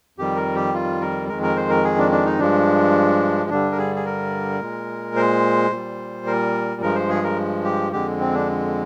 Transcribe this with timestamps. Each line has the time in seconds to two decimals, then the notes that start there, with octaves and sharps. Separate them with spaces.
0.18 F2 D#3 G3 G4
0.36 A#4
0.55 G4
0.74 F4
1.01 A#4
1.29 F2 D#3 G#3 A#4
1.43 A#4
1.56 C5
1.70 A#4
1.84 G#4
1.98 D4
2.12 D4
2.26 D#4
2.39 G2 F3 G#3 D4
3.50 G2 D3 G3 D4
3.72 A#4
3.78 G#4
3.96 G#4
4.05 A#4
4.61 A#2 G#3
5.16 C5
5.71 A#2 G3
6.27 A#4
6.81 G2 F3 G#3 A#4
6.95 C5
7.09 G#4
7.23 A#4
7.64 G4
7.93 F2 D3 G#3 G4
8.20 C4
8.34 D4